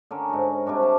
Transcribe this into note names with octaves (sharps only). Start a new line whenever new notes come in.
D3 C#4 A#4
G#2 F#4
C3 G3 D4 F#4
G4 F5 A5